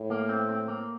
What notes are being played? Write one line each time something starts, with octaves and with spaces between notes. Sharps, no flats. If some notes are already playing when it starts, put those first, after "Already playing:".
Already playing: A2
A#3
C4
C4
A#3